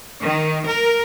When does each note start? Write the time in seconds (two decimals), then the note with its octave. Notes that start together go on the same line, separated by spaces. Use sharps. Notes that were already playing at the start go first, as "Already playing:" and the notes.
0.23 D#3
0.66 A#4